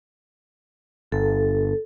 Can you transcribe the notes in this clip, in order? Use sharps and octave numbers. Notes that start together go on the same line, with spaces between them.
G1 A4